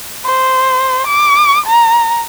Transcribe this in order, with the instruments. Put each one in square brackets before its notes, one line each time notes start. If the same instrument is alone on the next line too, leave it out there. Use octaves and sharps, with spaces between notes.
[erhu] C5
D6
A#5